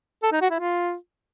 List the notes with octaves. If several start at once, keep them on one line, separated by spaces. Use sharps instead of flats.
A4
D#4
F#4
E4
F4